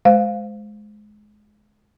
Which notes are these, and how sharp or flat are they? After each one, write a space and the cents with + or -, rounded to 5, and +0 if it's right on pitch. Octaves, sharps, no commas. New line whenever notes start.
G#3 +20 C5 -20 F5 +0